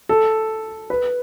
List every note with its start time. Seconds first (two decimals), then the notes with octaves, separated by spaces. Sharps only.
0.09 A4
0.90 B4